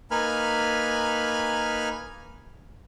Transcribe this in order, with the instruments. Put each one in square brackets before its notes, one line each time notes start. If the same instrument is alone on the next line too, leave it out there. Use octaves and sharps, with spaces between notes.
[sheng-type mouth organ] A#3 D#4 B4 G#5 B5 F6